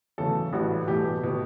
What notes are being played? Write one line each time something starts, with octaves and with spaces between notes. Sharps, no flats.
E2 C#3 F#3 A3 A4
A1 A2 G3 F#4
E2 B2 A3 G4
B2